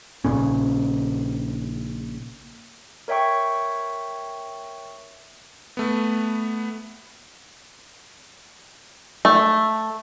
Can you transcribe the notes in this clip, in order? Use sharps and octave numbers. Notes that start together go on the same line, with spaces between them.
A#1 A#2 C#3 C#4
A#4 C#5 E5 G5 C#6
A3 B3
A3